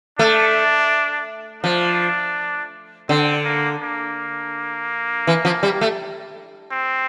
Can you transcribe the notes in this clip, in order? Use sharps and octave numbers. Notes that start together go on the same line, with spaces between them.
A3 D4
F3 D4
D3 C4
A#3
A#3
E3
F3
G3
A3
C4